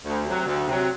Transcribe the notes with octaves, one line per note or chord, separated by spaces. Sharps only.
D2
C3 F#3
D2
C3 F#3